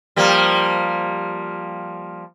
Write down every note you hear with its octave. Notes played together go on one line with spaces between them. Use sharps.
F3 G3 A#3